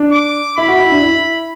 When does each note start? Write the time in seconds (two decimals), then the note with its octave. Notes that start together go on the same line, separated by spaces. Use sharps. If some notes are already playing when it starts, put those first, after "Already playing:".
Already playing: D4
0.12 D6
0.57 E4 B5
0.68 F#4
0.79 E4
0.91 D4
1.03 E4